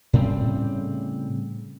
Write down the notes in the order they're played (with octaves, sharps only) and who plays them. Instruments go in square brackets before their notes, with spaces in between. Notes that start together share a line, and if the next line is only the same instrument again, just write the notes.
[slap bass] A2 C#3 G3 C4